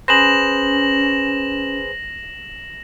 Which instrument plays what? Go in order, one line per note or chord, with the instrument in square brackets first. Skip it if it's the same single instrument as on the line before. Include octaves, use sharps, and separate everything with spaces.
[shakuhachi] C#4 [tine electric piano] G#4 B4 C5 [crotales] A#6 E7 F#7